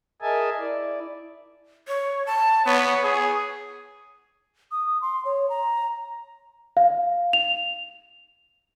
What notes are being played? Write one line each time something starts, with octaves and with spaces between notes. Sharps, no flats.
G#4 A#4 D#5 E5 G#5 A5
E4 D5
C#5
A5
B3 C#5
G#4
D#6
C6
C#5
A#5
F5
F7